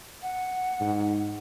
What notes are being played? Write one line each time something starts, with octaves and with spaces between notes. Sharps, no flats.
F#5
G#2